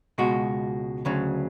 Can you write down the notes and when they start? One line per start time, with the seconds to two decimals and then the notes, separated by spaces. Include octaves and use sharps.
0.18 C#2 B2 G#3 F#4
1.05 D2 C#3 F#3